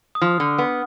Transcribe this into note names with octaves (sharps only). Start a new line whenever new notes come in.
D#6
F3 F6
D3
B3